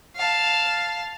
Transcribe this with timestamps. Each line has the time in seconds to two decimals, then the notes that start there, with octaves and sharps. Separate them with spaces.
0.16 F5 A5